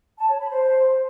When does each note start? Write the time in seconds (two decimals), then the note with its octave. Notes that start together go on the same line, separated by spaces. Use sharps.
0.18 A5
0.29 C#5
0.39 B5
0.49 C5